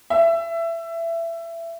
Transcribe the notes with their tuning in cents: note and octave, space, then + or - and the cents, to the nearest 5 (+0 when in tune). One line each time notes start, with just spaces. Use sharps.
E5 +20